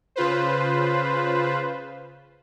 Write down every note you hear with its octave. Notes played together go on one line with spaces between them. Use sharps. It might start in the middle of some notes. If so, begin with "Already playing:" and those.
C#3 F4 B4 C5